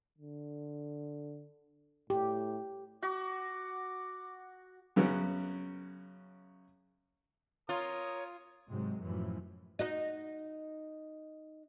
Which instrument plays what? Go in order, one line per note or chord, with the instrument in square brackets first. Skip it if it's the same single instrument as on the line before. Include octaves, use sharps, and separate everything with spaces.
[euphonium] D3
[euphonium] A2 [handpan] G4
[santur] F#4 [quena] D6
[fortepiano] F#2 C#3 B3 C#4 F#4
[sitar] F4 [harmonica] A#4 D#6 [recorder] C#5
[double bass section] G#2 C3 F#3 G#3
F#2 A2 E3 F3
[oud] D#4 F#4 D#5